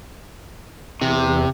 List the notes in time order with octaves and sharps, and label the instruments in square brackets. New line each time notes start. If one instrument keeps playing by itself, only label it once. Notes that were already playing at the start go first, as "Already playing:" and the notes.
[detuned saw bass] E2 [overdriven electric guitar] C3